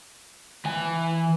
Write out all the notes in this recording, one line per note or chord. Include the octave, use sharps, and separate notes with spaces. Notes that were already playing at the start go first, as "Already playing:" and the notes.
E3 G#5